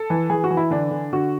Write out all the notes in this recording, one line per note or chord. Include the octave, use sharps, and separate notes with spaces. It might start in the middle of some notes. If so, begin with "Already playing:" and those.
Already playing: A4
E3
E3 G#4
F#4
E3
E4
D3 D4
D3
D3 F#4